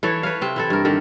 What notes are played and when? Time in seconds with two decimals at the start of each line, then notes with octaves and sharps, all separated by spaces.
0.03 E3 A4 C#5
0.23 B4 C#5 F5
0.41 C3 C4
0.56 E3 E4 A4
0.70 G2 A#4
0.85 D3 D#3 G4 A4